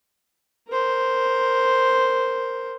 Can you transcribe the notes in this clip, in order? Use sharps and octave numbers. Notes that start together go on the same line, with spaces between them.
A#4 C5